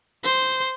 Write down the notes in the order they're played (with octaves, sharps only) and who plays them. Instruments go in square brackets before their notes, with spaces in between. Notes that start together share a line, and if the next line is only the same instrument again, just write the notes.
[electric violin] C5